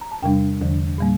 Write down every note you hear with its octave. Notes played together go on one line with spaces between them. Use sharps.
A#5
A5
E2 C3 G3 D4 G5
E2 D3 F3
A#2 G3 A#3